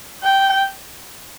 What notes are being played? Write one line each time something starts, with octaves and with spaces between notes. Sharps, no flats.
G5